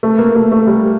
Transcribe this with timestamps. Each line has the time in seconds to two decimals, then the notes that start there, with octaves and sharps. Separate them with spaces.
0.03 A3
0.18 A#3
0.35 A3
0.51 A3
0.67 G3